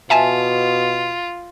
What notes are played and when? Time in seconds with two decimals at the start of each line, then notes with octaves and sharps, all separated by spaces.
0.10 B2 F4 E5 G#5 A5